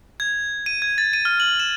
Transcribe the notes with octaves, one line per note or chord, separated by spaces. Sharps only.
G#6
D#7
G#6
A6
D#7
F6
F#7
E7